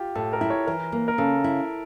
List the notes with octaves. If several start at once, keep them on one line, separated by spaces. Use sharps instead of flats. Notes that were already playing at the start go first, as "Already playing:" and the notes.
Already playing: F4 G4
A2 A4
A#4
E4
C#5
E3 A#4
A#3
A#4
C#3 A4
E4